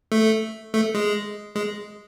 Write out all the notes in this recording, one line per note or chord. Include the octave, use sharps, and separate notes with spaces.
A3
A3
G#3
G#3